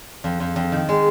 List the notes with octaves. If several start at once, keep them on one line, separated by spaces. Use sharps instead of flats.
F2
F2
F2
D#3
G#3